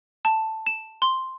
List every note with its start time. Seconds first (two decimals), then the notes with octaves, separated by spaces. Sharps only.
0.25 A5
0.66 E7
1.02 C6